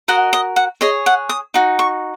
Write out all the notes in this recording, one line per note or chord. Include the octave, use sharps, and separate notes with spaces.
F#4 A#4 D#5 F#5
D#5
F#5
G#4 C#5 D#5
F#5
D#6
D#4 F#4
C#6